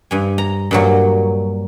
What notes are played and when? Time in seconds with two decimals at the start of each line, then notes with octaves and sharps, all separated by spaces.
0.11 G2 G#5
0.38 A#5
0.71 G2 A#2 F#3